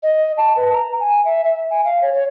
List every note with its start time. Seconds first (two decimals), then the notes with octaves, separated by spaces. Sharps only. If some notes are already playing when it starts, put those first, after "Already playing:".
0.03 D#5
0.38 A5
0.57 B4
0.73 A#5
1.00 G#5
1.25 E5
1.44 E5
1.70 G#5
1.85 F5
2.02 C#5
2.14 C#5